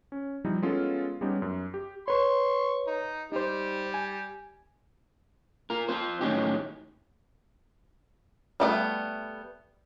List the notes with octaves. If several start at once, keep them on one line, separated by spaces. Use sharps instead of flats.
C#4
F3 G3 C4 D#4 E4
G#3 B3 C#4 F4 A4 F5
G3 G#3 B3 C#4 D#4 G4
F#2
G4
B4 C#5 C6 C#6
D#4
G3 D#4 C5
G#5
F4 A#4
C4 F4 C5
A2 D#3 F#3 C#4 D#4 G4
G3 A3 B3